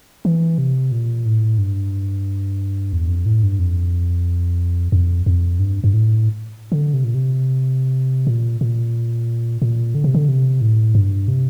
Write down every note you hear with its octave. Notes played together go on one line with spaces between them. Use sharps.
E3
C3
A#2
A2
G2
E2
F2
A2
G2
F2
F2
F2
G2
G2
A2
D3
C3
A#2
C3
A#2
A#2
A#2
D3
C3
D3
C3
A2
G2
C3